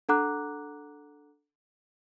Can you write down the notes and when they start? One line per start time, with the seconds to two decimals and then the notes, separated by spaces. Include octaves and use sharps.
0.09 D4 A4 F#5 A#5 D6 F#6